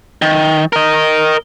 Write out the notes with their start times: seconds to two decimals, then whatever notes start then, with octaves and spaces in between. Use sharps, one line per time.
0.22 D#3
0.73 A#4 D#5